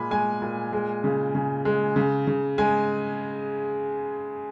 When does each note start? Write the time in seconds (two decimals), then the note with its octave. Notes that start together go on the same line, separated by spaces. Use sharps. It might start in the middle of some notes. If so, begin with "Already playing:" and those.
Already playing: A#2 G#3 G#5 B5
0.11 G#3 G#5
0.42 A#2
0.73 G#3
1.04 C#3
1.35 C#3
1.65 G#3
1.96 C#3
2.27 C#3
2.58 G#3 G#5